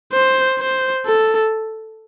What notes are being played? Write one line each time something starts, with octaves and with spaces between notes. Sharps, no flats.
C5
C5
A4